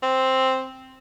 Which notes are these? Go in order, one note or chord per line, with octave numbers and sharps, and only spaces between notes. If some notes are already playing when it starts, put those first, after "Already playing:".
C4